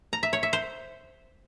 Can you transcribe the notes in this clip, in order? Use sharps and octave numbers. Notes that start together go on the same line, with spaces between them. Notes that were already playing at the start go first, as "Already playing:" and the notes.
A#5
E5
C#5
E5
C5